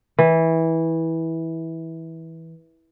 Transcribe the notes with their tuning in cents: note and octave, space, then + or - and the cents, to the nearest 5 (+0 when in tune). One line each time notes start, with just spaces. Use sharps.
E3 -15